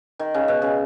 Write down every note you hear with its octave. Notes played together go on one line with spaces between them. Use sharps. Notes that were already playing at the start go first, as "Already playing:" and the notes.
D#3
C#3
B2
C#3